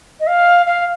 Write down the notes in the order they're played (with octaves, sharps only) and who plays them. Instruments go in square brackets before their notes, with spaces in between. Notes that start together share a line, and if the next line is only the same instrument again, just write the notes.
[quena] D#5
F5
F5